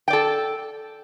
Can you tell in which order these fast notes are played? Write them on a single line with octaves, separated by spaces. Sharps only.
G5 D5 A4